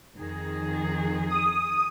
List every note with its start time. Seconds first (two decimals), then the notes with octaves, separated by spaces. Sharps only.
0.16 F2 D#3 G#4
1.29 D#6